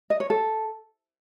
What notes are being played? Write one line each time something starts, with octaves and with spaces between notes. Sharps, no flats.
D#5
C#5
A4